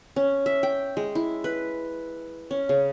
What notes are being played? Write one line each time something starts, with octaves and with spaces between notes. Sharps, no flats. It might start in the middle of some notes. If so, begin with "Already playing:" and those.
C#4
E5
G5
G#3
E4
B4
C#4
C#3